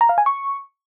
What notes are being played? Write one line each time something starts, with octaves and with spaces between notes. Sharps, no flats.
A#5
F5
G#5
C#6